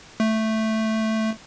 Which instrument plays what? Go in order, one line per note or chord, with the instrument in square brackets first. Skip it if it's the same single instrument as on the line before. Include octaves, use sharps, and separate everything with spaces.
[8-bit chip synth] A3